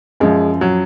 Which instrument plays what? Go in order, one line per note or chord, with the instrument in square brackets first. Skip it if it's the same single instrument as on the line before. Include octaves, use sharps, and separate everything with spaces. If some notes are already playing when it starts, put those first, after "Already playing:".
[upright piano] F#2 F3 G#3
F#3